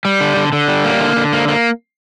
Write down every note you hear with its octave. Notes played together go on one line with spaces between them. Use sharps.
G3
D3
D3
D3
G3
A#3
D3
D3
A#3
A#3